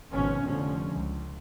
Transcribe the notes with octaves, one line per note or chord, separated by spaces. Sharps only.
G#1 B2 F3 B3 C#4
F1 D3 F3 C#4
C#2